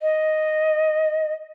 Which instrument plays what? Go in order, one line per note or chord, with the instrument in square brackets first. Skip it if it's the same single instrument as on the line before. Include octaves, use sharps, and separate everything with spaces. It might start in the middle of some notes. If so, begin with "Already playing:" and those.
[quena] D#5